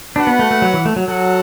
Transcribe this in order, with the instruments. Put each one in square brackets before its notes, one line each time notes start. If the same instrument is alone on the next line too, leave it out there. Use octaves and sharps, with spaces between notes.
[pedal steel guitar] D4 [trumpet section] F#4 B4 F#5
[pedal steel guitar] B3
A3
A3
F#3
E3
A3
F#3
[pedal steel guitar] F#3 [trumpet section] F#4 A4 F#5